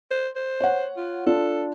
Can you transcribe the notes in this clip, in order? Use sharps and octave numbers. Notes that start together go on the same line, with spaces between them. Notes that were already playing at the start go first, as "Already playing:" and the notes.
C5
C5
C#5 F#5
F4
D4 F4 A4